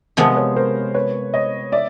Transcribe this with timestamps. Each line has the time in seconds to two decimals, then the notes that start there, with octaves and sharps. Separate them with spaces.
0.17 C3 F3 G#3 B3 A#4 C5
0.36 B4 C#5
0.56 A#4 C5
0.94 B4 C#5
1.34 C#5 D#5
1.72 D5 E5